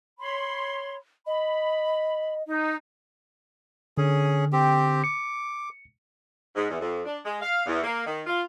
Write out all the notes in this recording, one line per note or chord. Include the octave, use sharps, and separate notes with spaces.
C#5 B5 C6
D#5 B5
D#4
D3 C#4 G#4
C4 G4
D6 C#7
G#2
E2
F2
D4
G#3
F5
E2
A#3
D#3
F4